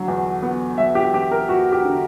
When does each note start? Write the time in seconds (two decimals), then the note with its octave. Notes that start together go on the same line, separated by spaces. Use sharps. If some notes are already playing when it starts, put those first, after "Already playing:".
Already playing: D3 F#3 F#5
0.08 E2
0.43 B3
0.78 F#3 E5
0.95 G4
1.14 E2 G4
1.31 A#4
1.49 E2 F#4
1.72 G4
1.84 D3